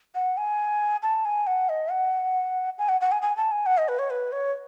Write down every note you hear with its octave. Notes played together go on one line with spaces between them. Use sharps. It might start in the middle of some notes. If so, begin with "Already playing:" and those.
F#5
G#5
A5
G#5
F#5
D#5
F#5
G#5
F#5
F#5
G#5
G#5
A5
G#5
F#5
D#5
B4
C#5
B4
C#5